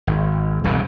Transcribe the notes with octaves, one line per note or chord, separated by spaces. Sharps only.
G#1
E1 C2 G2 C#3